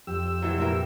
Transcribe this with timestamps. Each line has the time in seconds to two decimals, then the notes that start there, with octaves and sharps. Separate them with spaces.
0.07 F2 G4 E6
0.42 C3 E3 F#3
0.58 A#2 E3 A#4